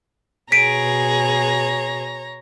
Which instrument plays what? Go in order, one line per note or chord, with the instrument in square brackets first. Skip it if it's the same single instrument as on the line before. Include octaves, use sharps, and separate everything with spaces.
[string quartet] B2 G#4 [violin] C#5 A#5 [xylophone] B6 D7 D#7